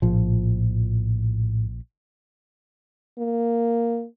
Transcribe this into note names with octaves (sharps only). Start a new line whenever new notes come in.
A#1 A2 F3
A#3